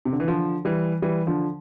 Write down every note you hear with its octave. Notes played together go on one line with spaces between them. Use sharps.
C3
D3
E3
D3 F3
E3 G3
E3 G3
D3 F3